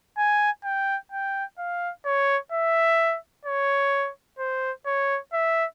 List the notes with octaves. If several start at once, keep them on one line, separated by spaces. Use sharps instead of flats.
G#5
G5
G5
F5
C#5
E5
C#5
C5
C#5
E5